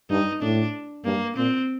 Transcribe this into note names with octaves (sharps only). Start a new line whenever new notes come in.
G2 D#4
A2 D4
G2 A#3
A#2 C4